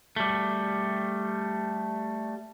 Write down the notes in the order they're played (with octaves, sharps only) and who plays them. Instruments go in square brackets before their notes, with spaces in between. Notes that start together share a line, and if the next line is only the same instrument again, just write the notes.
[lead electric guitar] G3 A3